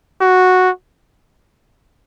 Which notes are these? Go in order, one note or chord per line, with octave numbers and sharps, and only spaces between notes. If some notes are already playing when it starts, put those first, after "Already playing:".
F#4